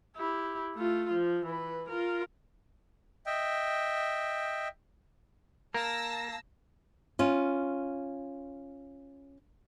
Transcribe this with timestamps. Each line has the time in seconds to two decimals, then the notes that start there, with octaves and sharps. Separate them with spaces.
0.16 E4 G4
0.75 A3 F4
1.13 F3
1.45 E3 B4
1.88 F4 A#4
3.26 D#5 E5 G5
5.74 A#3 A#4 A5 E6 A#6
7.19 C#4 F4